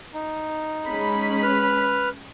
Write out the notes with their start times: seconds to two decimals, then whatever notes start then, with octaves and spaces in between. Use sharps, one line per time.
0.14 D#4
0.87 G#3 C#4 B5
1.43 B4 F6